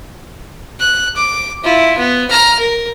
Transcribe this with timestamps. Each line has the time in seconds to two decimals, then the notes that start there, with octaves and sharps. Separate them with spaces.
0.80 F#6
1.16 D6
1.64 E4 F4
1.98 B3
2.30 A#5 F6
2.59 A#4